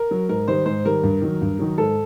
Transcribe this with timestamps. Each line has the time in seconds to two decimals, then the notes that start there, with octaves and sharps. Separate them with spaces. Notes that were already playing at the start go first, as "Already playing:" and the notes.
Already playing: A#4
0.11 F#3
0.29 G#2 A#4
0.48 D#3 G3 C5
0.66 G#2 C5
0.85 D#3 G3 A#4
1.03 G2
1.22 D#3 F#3
1.41 G2
1.59 D#3 F#3
1.78 G#2 A4